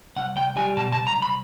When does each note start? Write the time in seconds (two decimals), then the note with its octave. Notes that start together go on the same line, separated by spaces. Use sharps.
0.16 C2 F#5
0.36 C2 G5
0.56 G3 G#5
0.77 B2 A5
0.92 A5
0.97 C2
1.07 A#5
1.17 C2
1.22 B5